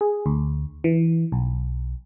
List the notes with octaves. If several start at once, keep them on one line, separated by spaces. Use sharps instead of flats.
G#4
D2
E3
B1